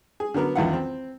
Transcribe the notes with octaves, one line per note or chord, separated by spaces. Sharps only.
G#4
D3 F#3 B3 A#4
A#1 E2 D#3 E4 F5 F#5
C4